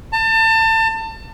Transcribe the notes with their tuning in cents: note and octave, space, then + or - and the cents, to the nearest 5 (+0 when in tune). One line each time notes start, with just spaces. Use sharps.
A5 +30